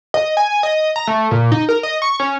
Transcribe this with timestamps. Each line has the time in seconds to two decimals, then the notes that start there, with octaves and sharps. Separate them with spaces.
0.14 D#5
0.37 G#5
0.63 D#5
0.96 A#5
1.08 A3
1.31 A#2
1.52 D#4
1.69 A#4
1.83 D#5
2.02 C#6
2.20 C#4